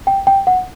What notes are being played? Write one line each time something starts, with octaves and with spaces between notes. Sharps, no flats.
G5
G5
F#5